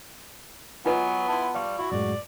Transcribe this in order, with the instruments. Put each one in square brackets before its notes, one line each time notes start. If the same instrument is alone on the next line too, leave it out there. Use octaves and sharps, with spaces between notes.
[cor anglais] F#3 [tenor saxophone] B3 [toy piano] F4 B4 D#5 [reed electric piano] G#5
[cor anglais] E4 [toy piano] A5 C6
[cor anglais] G3 [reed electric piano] D5 F5 C#6
[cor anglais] E4 [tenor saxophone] F#4
[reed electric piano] F#2 A2 G#3 [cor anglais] D5